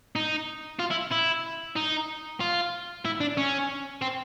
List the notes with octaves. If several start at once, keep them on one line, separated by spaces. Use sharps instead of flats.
D#4
F4
E4
E4
D#4
F4
E4
D4
C#4
C4